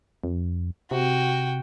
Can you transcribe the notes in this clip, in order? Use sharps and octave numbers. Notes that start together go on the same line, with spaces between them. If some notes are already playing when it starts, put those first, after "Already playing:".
F2
C3 F#4 G5